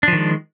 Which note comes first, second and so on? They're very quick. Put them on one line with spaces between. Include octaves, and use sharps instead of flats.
D4 F3 D#3 G#3